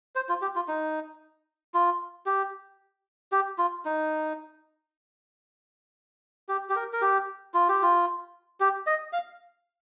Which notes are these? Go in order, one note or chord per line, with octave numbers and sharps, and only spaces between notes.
C5
F4
G4
F4
D#4
F4
G4
G4
F4
D#4
G4
G4
A#4
A#4
G4
F4
G4
F4
G4
D#5
F5